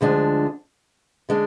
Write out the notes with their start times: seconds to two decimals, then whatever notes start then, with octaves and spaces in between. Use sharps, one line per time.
0.01 D2 D3 F3 G#3 D4
1.29 D3 G#3 D4